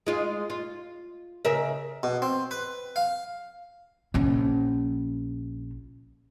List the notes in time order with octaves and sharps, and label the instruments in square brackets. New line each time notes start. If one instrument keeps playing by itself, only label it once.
[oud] G#3 F4
F4
C#3 A#4 E5
[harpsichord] B2
C4
B4
F5
[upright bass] A#1 C#4